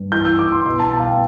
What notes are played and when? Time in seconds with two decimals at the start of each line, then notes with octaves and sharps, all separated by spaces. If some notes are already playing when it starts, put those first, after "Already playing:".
Already playing: G2
0.12 E3 G6
0.25 E6
0.39 E3 D6
0.52 C6
0.66 B2 C6
0.80 A5
0.93 B2 A5
1.00 F5
1.06 G5